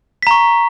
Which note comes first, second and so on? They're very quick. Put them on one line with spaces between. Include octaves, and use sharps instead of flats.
B6 A#5 C#6